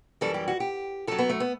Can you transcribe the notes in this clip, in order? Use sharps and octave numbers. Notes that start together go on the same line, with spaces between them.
F#2 E3 G3 A4
G4
F#4
G4
F#2 F#3 A4
B3
A3
B3